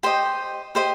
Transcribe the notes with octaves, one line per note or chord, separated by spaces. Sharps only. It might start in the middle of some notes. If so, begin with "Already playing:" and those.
G4 C5 D#5 G5
G4 C5 D#5